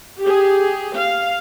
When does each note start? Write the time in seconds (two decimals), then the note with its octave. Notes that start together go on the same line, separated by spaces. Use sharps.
0.21 G4 G#4
0.98 F5